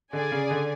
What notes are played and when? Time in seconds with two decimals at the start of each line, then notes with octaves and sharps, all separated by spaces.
0.13 D3 G#4 D5 G#5
0.32 C#3
0.51 D3